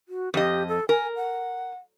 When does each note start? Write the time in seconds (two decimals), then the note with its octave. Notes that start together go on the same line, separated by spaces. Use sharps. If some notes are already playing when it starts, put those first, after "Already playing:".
0.09 F#4
0.34 F2 G4 D#5
0.68 A4
0.89 A#4 G#5
1.16 F#5